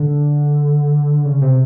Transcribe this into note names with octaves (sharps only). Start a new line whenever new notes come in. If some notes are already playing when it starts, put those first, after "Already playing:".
Already playing: D3
C#3
C3